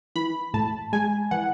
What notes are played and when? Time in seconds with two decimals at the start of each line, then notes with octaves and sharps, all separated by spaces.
0.15 E3 B5
0.54 A2 A5
0.93 G#3 G#5
1.31 E3 F#5